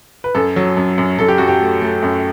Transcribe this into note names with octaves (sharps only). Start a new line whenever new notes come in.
B4
F#2 A4
F#3
F#2
F#2
F#2 A4
G4
F#2 F#4
G4
A3
A3
F#2